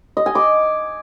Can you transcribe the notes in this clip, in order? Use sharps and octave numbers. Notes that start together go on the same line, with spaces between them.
D#5
G#5
D6